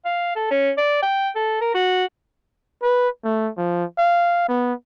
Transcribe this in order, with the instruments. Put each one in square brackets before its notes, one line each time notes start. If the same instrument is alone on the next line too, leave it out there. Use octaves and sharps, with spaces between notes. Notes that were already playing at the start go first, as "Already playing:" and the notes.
[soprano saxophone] F5
A4
C#4
D5
G5
A4
A#4
F#4
[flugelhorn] B4
A3
F3
F5
B3